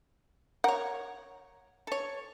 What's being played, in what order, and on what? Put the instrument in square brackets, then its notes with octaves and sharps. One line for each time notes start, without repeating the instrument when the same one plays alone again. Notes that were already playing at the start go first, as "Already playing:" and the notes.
[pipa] A#4 C#5 [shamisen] F#5
[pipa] A4 C#5